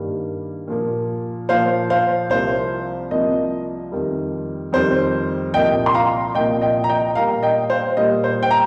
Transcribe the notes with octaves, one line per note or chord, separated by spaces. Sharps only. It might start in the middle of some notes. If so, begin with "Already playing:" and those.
Already playing: G2 D#3 G3 A#3
A#2 F3 A#3
A#2 F3 A#3 C5 F5
C5 F5
C2 C3 F3 A#3 C5 F5
C2 C3 F3 A#3 D#5
F2 D#3 G3
F2 D#3 G3 C5
C2 A#2 F3 A#3 D#5 G5
C6
F5 A#5
C2 A#2 F3 A#3 D#5 G5
D#5 G5
A#5
D#5 G5
A#2 G3 A#3 F5 A#5
D#5 G5
C5 F5
A#2 G3 A#3 D#5
C5
G5
A#5